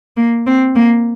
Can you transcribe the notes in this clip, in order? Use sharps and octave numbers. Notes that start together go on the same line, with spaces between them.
A#3
C4
A#3